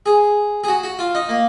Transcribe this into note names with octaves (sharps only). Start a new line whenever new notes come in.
G#4
G#4
F#4
F#4
F4
D#4
A#3